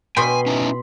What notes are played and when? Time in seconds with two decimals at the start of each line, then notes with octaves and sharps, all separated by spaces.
0.17 B2 G5 G#5 B5 C6
0.46 C#4 D#4 E4